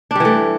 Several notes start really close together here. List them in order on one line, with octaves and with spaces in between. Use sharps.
D4 G3 E3 A3